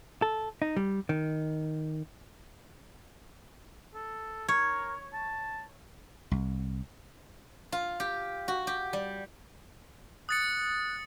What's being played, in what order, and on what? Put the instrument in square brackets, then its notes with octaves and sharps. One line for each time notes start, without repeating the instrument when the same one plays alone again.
[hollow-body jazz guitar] A4
D#4
G3
D#3
[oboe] A4
[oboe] A#4 [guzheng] C#5
[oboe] A5
[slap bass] C2
[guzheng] F4
G4
F#4
G4
G3
[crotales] D#6 A6 C#7 [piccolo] F#6